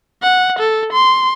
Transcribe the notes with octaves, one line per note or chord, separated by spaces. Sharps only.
F#5
A4
C6